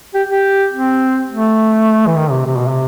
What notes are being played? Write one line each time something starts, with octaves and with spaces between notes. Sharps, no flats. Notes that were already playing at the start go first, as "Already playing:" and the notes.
G4
G4
C4
A3
E3
D#3
C3
C3
B2
C3